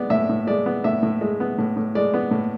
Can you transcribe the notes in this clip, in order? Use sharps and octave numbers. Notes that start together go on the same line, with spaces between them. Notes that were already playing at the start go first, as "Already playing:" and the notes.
Already playing: G#3 B3 D5
A2 E5
A2
G#3 D5
B3
A2 E5
A2
G#3
B3
A2
A2
G#3 D5
B3
A2